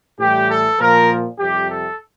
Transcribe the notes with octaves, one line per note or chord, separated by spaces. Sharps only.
A2 E3 G3 G4
A4
A#2 F3 A#4
F2 C3 G3 G4
A4